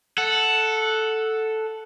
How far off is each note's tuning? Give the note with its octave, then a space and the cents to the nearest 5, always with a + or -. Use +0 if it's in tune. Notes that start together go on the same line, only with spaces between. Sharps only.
A4 +0 F#5 +0